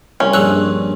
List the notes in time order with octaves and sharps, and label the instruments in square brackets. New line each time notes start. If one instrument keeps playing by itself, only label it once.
[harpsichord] C2 [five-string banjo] C#4
[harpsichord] A#1 G2 C#6 [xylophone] G#4 E6 F#6